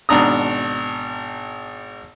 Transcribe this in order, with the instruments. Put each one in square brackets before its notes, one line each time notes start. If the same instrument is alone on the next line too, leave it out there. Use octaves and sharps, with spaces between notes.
[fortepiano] G#1 B2 D4 A#5 D#6